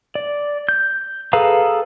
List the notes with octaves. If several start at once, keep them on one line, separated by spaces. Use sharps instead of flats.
D5
G6
G#4 A4 B4 F5 A#5